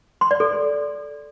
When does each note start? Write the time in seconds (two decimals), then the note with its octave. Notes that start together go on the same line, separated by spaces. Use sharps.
0.21 C6
0.31 D5
0.40 A4